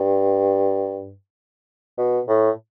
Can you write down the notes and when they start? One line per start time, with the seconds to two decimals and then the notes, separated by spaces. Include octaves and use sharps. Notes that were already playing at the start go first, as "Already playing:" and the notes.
Already playing: G2
1.98 B2
2.28 A2